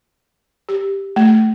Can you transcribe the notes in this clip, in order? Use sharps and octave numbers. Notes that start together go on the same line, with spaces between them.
G4
A3